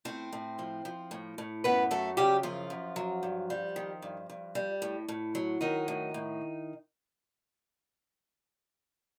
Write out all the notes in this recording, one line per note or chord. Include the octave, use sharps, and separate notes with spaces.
A2 C4 C5
A2
F3
F3
A2
A2
F#2 B3 B4
F#3 A3 A4
C#3 G3 G4
F#2 F3 F4
F#2
F#3
G2
G3
D#3
G2
G2
G3
A2
A2
F#3
D#3 F#3 D#4
A2
A2